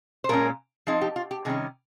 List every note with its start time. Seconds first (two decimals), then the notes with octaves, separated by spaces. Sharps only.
0.24 C5
0.29 A#2 G#3 C#4 A#4
0.87 F3 C4 D#4 G#4
1.02 G4
1.16 F4
1.31 G4
1.45 C3 D#3 G3 C#4 G#4